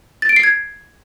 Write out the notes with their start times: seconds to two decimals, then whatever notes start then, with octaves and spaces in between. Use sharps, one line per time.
0.22 A6
0.29 D7
0.36 C7
0.43 G#6